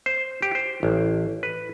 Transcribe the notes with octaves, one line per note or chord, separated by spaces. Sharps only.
C5
G4
C5
A1
B4